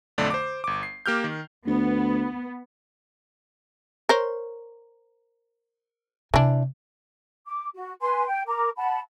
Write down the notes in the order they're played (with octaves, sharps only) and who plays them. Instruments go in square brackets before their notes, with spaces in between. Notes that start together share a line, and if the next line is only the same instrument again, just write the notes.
[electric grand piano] B1 F2 D3 A3 D5
C5 D6
G1 D6
C7
A#3 G4 F6 G6
D#3
[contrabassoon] D2 [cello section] B3
[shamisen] A#4 C5 C#5
[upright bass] C3 [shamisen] E3 D4
[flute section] D6
F#4
B4 G#5 C6
G5
A#4 A#5 D6
F#5 A5 B5